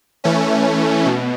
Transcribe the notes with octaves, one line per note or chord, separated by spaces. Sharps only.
E3 A3 C#4
B2